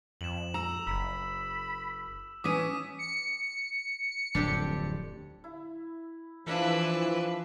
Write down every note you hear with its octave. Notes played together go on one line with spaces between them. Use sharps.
F2 E7 F#7
A#5 E6 E7
F#1 B5 E6
E3 C#4 D6 D#6 B6 D#7
C#7
D1 F2 D4 G4 A4
E4
E3 F3 D4 E4 A4 B4 F5